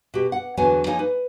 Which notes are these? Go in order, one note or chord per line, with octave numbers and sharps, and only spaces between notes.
B2 G4
F#5
E2 D3 F#3 B3 C#5 G#5
F3 A#3 D#4 C#5 G#5
B4